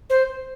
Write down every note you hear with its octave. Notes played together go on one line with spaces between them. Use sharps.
C5